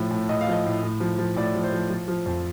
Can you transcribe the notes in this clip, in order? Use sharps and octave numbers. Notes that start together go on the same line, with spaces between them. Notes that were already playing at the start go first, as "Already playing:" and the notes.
Already playing: A2 F3
A2
A2 D#5
F5
F3 D#5
A2
A2
F3
F3
A2 D5
F3
C5
F3
F3
F3
F2